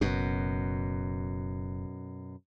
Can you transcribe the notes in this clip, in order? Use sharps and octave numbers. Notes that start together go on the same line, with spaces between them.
F#1 F#2 B2